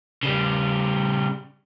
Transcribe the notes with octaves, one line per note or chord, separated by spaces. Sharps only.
C#3 G3